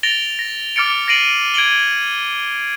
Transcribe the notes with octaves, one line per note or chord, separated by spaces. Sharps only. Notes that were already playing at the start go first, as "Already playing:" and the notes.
A6 A#6 D7 F7 G7
A#6
D6 F6 A6 C#7 D7
A6 A#6 C7 D7 D#7 F#7
G#6 D7 D#7 F#7 G7